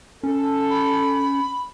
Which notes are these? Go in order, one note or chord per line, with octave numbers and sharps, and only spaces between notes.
C#4 A4
B5